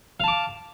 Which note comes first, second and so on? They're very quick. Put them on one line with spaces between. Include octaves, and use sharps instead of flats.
F5 A5 D6